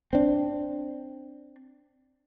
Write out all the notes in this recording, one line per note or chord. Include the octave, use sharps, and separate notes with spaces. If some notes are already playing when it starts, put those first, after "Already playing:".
C4 D4